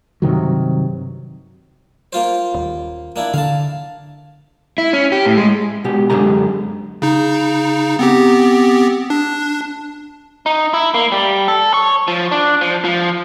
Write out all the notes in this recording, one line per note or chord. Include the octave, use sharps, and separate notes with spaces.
G2 C3 D#3 F#3
A#3 F4 C5
D#1
A#3 D4 E4
D3 F5 A5
E4
C#4
G4
A2
G#3
B2 G#3 G4
F#2 D3 F3 G#3 G4 A#5
C#3 D#4
B3 C4 G4
D4
D#4
E4
A#3
G3
A4
C#5
F3
D4
F3
F3